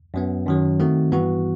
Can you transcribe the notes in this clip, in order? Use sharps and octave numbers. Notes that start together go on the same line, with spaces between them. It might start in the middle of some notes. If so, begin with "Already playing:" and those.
F#2 F#3 B3
F#2 D#3 F#3
D#3 A3 C4 F#4
G2 E3 B3 F#4